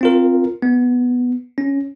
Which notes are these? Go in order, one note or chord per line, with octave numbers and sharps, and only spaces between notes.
C4 F4 A#4
B3
C#4